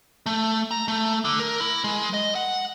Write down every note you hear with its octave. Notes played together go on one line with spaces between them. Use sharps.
A3
A#5
A3
D3
A#4
E4
G#3
D#5
F#5